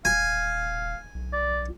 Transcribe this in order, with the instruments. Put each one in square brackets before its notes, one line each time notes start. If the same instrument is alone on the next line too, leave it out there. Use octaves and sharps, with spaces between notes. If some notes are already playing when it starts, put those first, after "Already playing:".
[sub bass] D#1 [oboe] F5 [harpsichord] G#5
[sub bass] B1
[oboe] D5